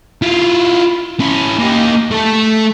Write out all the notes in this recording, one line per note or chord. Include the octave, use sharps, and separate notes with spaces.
E4 F4
C#4 E4
A#3 G4
A3 A4